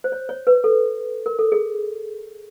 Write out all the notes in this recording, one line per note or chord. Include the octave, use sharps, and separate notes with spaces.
C5
C#5
C#5
B4
A4
A#4
A4
G#4